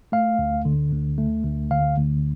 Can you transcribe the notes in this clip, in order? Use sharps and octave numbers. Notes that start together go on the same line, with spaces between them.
A3 F5
D2
D3
D2
A3
D2
D3 F5
D2